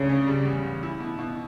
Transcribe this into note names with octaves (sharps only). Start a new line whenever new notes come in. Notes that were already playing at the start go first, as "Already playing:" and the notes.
Already playing: C#2 C#3 A3 D4
C#4
G3
E2
E2
E4
B2
B2